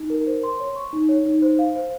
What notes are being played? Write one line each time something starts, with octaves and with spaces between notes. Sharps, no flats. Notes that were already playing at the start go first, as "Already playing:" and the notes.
Already playing: D#4
A#4
C5
C6
C#5
C#6
D#4
C#5
D#4
C5
F5
C5